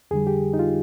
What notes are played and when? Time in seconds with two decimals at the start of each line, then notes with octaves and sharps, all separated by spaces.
0.11 F2 D3 G3 G#4
0.27 G4
0.53 D#4
0.59 F4